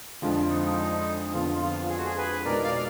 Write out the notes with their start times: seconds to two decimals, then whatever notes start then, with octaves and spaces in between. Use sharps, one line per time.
0.22 F2 D3 F3 G#3 D4 F4
0.50 D#4
0.58 F4
0.66 D#4
1.34 F2 D3 F3 B3 F4
1.61 F4
1.89 G#4
1.97 F#4
2.05 G#4
2.17 G#4 B4
2.45 B2 G#3 D#4 A#4 D5
2.64 D5 F5
2.75 F5